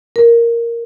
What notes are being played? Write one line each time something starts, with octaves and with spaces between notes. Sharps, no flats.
A#4